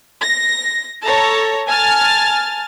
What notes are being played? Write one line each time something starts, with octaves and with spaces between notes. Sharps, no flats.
A#6
A4 C#5 A5 A#5
G#5 A5 F6 A6